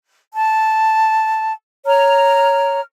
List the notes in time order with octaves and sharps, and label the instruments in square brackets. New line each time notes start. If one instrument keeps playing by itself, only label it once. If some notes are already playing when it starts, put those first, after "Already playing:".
[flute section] A5
C#5 A#5 F6